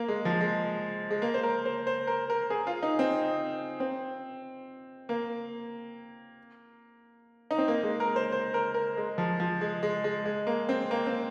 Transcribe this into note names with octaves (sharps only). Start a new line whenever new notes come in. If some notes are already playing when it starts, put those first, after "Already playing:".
Already playing: A#3
G#3
F3
G#3
G#3
A#3
C5
A#4
C5
C5
A#4
A#4
G#4
F4
D#4
C4
C4
A#3
D#4
C4
A#3
G#3
A#4
C5
C5
A#4
A#4
G#3
F3
F3
G#3
G#3
G#3
G#3
A#3
C4
A#3
C4